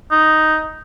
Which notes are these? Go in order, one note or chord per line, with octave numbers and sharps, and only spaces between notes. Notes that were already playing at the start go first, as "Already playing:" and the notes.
D#4